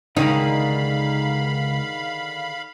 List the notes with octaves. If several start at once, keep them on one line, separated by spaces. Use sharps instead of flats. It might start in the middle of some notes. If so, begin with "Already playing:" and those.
C#2 D3 D#3 D#4 G#4 F5 B5